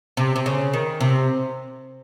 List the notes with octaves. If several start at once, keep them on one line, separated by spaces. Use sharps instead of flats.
C3
C3
C#3
D#3
C3